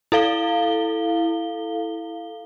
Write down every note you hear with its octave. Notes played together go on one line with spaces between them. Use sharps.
E4 A4 F5 G7